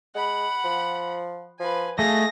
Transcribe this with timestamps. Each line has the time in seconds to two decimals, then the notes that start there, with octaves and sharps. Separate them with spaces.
0.15 G#3 F#5 B5
0.64 F3
1.60 F3 B4 G#5
1.99 A3 G#4 D#5 F5 A#6